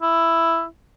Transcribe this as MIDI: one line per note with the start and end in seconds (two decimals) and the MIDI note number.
0.02 0.65 64